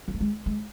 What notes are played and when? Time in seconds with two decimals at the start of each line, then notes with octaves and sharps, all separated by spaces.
0.08 F#3
0.14 A3
0.20 G#3
0.46 G#3